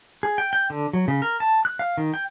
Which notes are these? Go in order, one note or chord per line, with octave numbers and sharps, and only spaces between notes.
G#4
G5
G5
D3
F#3
C#3
A#4
A5
F#6
F5
D#3
G5